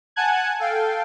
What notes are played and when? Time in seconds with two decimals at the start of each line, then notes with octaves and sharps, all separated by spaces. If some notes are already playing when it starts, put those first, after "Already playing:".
0.16 F#5 G#5 A5 F#6 G#6
0.60 A4 F5 G5